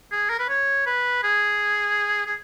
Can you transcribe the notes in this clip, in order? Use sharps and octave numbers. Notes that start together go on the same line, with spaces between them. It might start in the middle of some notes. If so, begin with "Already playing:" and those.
G#4
A#4
B4
C#5
B4
G#4
G#4